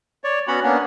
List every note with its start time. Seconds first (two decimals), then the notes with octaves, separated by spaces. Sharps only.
0.24 C#5 D5
0.48 B3 C#4 F#4 F#5 B5
0.63 A#3 B3 C#4 D4